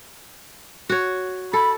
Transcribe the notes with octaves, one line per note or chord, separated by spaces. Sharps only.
F#4 C#5
A4 B5